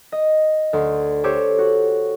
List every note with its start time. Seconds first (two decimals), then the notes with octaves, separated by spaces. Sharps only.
0.12 D#5
0.73 D2 C6
1.24 G4 A4 C5 C#5
1.58 F#4